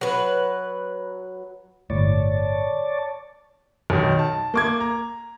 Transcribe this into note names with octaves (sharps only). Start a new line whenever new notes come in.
F#3 B4
G1 A2 C#5 D5 A5
B1 D#3
A5
A#3 D6 G#6
A#5